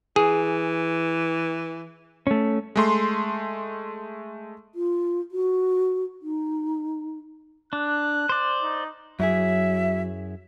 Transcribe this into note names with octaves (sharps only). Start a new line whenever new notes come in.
E3 G#4
A3 C#4
G#3 A3 C6
F4
F#4
D#4
D4 F#6
C5 D5
D#4
F#2 F#3 E4 G#4 E5